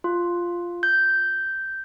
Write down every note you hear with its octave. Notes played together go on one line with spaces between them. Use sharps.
F4
G6